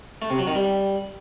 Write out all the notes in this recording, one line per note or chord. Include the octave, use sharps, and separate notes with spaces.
A3
C3
F#3
D#3
G3